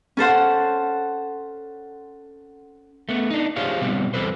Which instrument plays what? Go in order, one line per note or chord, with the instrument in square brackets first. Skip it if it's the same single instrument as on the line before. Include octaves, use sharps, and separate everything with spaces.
[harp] C#4 A4 C5 F#5
[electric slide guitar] A3 B3
D4 D#4
F4 G4 G#4 C5 C#5 F5
B2 G3 B3 C4
E2 G3 A4 B4 C5